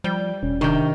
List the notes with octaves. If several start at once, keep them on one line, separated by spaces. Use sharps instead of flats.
F3 G3 G5
E1 C#4
C3 D#3 D4 G5 C#6